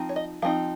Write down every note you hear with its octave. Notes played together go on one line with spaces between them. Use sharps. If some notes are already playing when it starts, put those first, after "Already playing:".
Already playing: F3 C4 D#4
C#5
D#5
F3 C4 D#4 F5